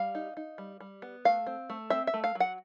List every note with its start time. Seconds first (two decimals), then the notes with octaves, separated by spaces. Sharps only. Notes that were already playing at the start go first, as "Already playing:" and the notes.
Already playing: G3 F5
0.15 D#4
0.37 D#4
0.58 G3
0.80 G3
1.02 B3
1.25 A3 F5
1.47 C4
1.70 A3
1.90 C4 E5
2.07 E5
2.14 A3
2.24 F5
2.35 F#3
2.40 F#5